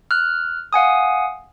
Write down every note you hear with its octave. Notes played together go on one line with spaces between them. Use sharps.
F6 F#6
F5 F#5 G#5 D#6